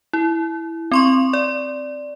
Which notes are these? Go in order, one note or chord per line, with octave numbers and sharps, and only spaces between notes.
E4
C4 C6 C#6
D5